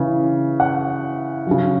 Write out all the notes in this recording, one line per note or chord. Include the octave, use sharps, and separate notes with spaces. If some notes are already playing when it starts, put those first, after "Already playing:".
Already playing: C#3 E3
F#5
C#3 F#3